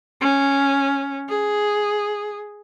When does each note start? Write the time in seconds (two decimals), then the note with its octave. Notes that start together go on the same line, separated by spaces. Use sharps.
0.21 C#4
1.29 G#4